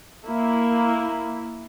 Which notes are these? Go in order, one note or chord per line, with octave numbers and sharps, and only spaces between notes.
A#3 E4